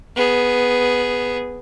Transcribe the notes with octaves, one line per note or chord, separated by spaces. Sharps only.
B3 G#4